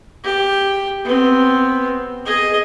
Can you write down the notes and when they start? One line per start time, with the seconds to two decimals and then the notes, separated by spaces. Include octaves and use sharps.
0.24 G4
1.04 B3 C4
2.25 G#4 D#5